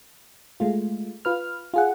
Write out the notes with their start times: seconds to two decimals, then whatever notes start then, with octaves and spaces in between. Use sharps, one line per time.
0.60 G#3 A3 F4
1.25 F4 B4 F6
1.74 F4 G#4 F#5